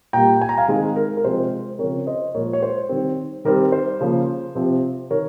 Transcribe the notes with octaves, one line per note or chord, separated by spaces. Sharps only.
A#2 G3 A#3 G5 A#5
G#5
A#5
F5 G#5
D#3 G#3 C4
A#4
A#4
C3 F3 G#3 C4 C5
C#3 F3 C4 A#4 C#5
C5 D#5
A#2 F3 G#3 A#4 C#5
C#5
C5
D#3 G3 C4
D#3 G3 C4 A#4
C5
C#3 F3 A#3
C3 F3 C4
D#3 A#4 C#5